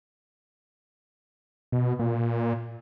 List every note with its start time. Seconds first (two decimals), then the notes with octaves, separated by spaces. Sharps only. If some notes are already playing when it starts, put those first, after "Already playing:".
1.72 B2
1.99 A#2